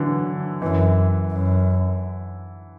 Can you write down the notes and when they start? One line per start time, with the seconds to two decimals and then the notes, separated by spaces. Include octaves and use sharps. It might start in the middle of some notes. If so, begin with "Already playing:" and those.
Already playing: D3 E3 F#3
0.62 F#2 E3
1.31 F#2